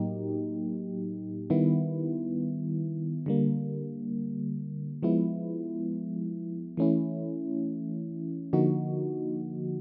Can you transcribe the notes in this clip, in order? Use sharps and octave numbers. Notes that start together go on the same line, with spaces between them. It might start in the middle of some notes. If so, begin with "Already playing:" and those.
Already playing: A2 F#3 A#3 D#4 G4
D#3 G3 B3 E4
D3 G3 A#3
F3 G#3 B3 E4
E3 A3 C#4 E4
D3 F3 A#3 D#4 F#4